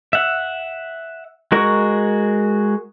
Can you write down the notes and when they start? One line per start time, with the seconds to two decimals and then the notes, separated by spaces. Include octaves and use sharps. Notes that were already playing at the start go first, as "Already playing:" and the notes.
0.13 E5 F#5
1.52 G#3 F#4 A#4 C#6